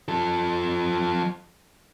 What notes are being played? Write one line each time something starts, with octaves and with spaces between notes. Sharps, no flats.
F3 A4